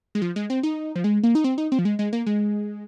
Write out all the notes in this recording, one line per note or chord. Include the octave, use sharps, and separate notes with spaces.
G#3
F3
G#3
C4
D#4
F3
G#3
A#3
D#4
C4
D#4
C4
F3
G#3
G#3
A#3
G#3